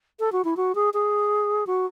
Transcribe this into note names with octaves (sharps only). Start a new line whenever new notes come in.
A4
F#4
E4
F#4
G#4
G#4
F#4